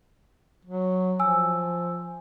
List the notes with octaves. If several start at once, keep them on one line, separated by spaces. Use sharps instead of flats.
F#3
F3 G#5 E6